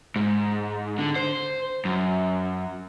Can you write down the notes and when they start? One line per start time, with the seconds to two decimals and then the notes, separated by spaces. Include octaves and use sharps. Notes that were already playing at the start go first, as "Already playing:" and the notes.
0.16 G#2
0.98 D3
1.16 C5
1.85 F#2